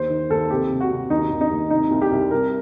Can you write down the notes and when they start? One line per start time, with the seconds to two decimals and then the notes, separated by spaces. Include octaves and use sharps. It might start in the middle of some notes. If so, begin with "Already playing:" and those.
Already playing: D#2 C5
0.10 D#3
0.30 D#2 A4
0.50 C3 G4
0.70 C3
0.81 F#4
0.91 C3
1.10 D#2 D#4
1.31 D#2
1.41 D#4
1.51 D#2
1.70 C3 D#4
1.91 C2
2.02 G4
2.12 C2
2.31 C2 A#4